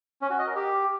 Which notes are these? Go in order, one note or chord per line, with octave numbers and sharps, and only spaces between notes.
C#4
F#4
D#5
A#4
G4